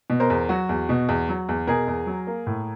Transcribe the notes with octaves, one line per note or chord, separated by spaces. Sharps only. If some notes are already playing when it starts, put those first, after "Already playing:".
B2
A#4 C5
E2
F#3 F#4
E2
B2
E2
F#3
E2
B2 G#4 A#4
E2
F#3
A#3
A2